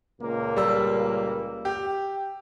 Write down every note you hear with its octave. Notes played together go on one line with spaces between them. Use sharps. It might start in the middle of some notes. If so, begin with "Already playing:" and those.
C#2 A#2 A#3
G3 E6
G4